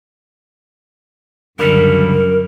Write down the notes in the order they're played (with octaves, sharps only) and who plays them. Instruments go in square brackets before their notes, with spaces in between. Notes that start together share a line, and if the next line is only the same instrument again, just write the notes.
[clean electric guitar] C#2 D3 G3 [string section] F#2 [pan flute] A#4